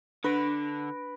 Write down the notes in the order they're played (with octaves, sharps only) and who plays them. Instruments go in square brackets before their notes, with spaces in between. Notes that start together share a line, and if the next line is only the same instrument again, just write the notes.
[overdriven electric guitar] D3 [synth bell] D4 A#6 D7 [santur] B4